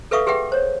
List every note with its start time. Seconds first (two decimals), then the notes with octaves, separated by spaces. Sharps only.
0.11 A4 B4 E5 F5 C#6 D#6
0.27 G4 G#4 B4 E5 F#5 G5
0.52 C5 C#5